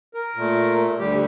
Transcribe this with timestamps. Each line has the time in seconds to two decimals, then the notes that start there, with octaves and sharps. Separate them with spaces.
0.14 A#4
0.36 A#2 A3
0.99 D2 D3 G3 G4